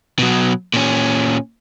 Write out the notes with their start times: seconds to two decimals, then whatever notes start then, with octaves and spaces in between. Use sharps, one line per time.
0.19 B2 F#3
0.74 A#2 C#4